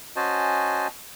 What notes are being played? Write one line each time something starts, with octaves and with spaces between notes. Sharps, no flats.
C#4 F#4 C5 D#5 G#5 A5